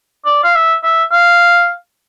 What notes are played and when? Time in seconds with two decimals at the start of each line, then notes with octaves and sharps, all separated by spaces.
0.25 D5
0.44 F5
0.55 E5
0.83 E5
1.12 F5